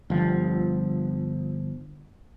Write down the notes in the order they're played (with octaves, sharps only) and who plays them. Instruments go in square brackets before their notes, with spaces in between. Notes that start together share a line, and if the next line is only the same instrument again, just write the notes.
[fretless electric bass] G1 F3